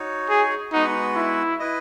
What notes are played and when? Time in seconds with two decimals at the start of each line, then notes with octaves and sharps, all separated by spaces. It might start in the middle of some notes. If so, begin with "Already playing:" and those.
Already playing: D#4 F#4 C#5
0.30 G#4
0.72 G#3 B3 D#4 F#4 B4 F#5
1.16 E4
1.60 E4 B4 D#5